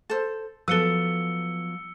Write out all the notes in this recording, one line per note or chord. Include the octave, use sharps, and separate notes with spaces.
A4 C5
F3 F#3 B3 A4 B4 E6 C#7 G7